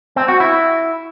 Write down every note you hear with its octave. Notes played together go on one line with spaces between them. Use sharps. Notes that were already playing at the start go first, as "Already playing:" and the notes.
C4
F#4
E4